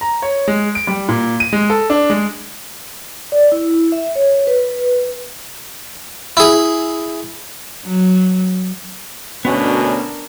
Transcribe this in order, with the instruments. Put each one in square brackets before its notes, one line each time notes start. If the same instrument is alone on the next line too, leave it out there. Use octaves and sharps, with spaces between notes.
[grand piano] A#5
C#5
G#3
D7
G3
A#2
D#7
G#3
A4
D4
G#3
[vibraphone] D5
E4
E5
C#5
B4
[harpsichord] E4 G#4
[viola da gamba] F#3
[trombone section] D2 B2 C#4 [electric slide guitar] B3 F#5 [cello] D4 A#4